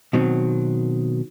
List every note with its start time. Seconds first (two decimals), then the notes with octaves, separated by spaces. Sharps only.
0.13 B2 D#3 F#3 C4